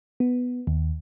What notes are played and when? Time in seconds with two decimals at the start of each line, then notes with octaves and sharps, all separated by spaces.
0.20 B3
0.67 D#2